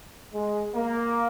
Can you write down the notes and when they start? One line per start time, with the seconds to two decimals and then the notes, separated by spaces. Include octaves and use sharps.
0.33 G#3
0.75 A#3